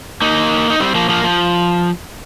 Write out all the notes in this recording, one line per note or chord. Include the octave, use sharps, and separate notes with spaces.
A#3 D#4
D#4
G3 C4
F3 A#3
F3 A#3
F3